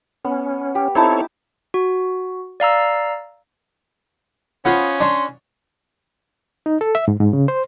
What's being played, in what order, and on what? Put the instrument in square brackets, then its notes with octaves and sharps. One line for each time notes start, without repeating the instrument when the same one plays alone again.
[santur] B3 [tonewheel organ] C#4
[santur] G4
[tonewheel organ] C4 A4 C#5 [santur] D#4 E4 A5
[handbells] F#4
D5 F5 A#5 E6
[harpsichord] B3 F4 C5 [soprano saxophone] C#4
[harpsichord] D4 C#5 [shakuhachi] C6
[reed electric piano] D#4
A4
E5
G#2
G#2
C#3
C5